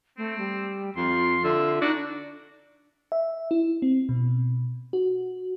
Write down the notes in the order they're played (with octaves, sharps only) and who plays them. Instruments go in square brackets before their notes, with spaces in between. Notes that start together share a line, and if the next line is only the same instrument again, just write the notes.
[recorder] A3 [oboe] C4
[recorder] G3
[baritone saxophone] F2 [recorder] F4 [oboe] C6
[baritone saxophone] D3 [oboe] E5
[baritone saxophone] D4 [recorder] D#4 [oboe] F#4
[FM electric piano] E5
E4
C4
B2
F#4